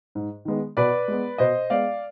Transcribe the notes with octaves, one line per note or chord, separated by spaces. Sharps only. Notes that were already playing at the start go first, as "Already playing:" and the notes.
G#2
D#3 G#3 B3
B2 B4 D5
G#3 B3
B2 C5 D#5
G#3 B3 D5 F5